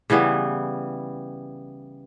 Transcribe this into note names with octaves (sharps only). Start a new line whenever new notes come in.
C#3 E3 G3 B3